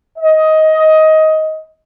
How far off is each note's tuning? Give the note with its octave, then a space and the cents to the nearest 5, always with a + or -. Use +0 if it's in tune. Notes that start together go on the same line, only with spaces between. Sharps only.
D#5 +15